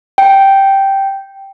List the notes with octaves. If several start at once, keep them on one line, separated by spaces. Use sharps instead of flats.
G5